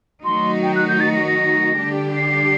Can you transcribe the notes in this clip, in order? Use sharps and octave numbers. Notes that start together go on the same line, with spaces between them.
D#3 F#3 A3 D#4 F#4 C6
G5
F#6
G6
A6
A#6
A#6
D3 G3 D4 G4
C7